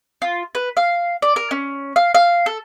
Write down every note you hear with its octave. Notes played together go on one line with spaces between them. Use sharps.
F4
B4
F5
D5
A#4
C#4
F5
F5
A4